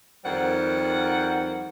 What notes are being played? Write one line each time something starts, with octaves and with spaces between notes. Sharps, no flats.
F2 D#3 G3 A#4 C5 F#5